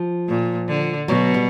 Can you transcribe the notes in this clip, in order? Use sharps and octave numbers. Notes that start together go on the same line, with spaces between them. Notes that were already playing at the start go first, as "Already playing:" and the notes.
Already playing: F3
A#2
D3
B2 F#3
G3